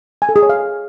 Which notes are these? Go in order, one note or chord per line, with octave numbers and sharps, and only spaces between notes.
G#5
A4
G#4
C#5
F5